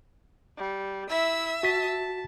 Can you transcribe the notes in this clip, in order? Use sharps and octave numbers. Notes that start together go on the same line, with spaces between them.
G3
E4 E5 E6
F#4 A5 B6